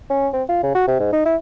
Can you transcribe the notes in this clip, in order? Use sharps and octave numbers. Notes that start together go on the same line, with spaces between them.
C#4
C4
F4
C#3
F#4
C3
G#2
D#4
E4